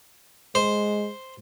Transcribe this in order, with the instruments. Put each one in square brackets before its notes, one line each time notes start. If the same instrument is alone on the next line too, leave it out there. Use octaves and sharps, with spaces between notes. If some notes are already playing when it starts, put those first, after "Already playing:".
[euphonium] G#3 [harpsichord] C5